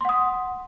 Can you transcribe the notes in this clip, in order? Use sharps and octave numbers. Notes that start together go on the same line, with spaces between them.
F#5 C6 D#6